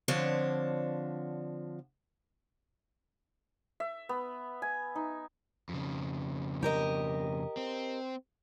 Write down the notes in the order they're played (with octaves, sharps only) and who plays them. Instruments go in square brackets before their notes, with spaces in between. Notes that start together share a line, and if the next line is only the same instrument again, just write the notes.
[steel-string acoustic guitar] D3 F3 C4 D4 C#5
[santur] E5
B3
G#5
D#4
[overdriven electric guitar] F2 C#3
[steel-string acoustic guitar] G4 A#4 D#5
[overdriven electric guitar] C4